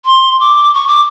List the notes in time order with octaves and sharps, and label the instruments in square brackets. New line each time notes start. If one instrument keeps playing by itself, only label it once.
[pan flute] C6
D6
C#6
D6